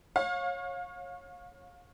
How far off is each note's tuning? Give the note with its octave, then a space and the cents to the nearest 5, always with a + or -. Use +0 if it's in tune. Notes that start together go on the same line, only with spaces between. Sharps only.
C#5 -20 F5 +30